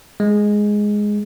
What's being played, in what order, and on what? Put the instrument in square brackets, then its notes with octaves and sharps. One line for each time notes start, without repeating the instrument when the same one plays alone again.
[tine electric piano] G#3